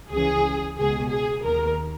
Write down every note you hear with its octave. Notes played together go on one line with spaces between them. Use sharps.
C#2 C#3 E3 G#4
C#2 B2 G#4
G#4
D#2 D#3 A#4